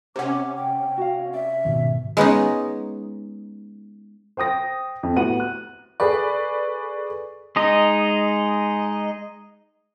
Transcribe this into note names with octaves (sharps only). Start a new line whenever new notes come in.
C3 C#4 C5 F#5 D6
G5
F#4 F5
D5 E5
G#2 B2 D#3
G#3 B3 C#4 D#4
C5 G5 D#6 A#6
F2
A2 B3 F#4 G4 F#5 D#7
F#6
G#4 A4 B4 D5 C#6
G#3 D#4 D#5